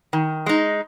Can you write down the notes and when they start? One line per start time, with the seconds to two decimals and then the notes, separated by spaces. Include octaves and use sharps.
0.13 D#3
0.46 G#3 D#4